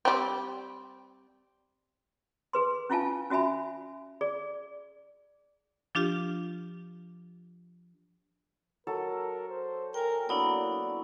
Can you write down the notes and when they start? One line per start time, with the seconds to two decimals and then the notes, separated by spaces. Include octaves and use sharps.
0.05 G3 C4
2.53 G#4 B4 C6
2.90 C#4 E4 F4 F5 G#5 A5
3.30 C#4 F#4 E5 G#5 B5
4.21 G#4 D5
5.95 F3 D4 F4 G4
8.87 F#3 A4 A#4
9.49 C5
9.94 A#4 G5 G#5
10.29 F#3 A#3 B3 D4 E4 D5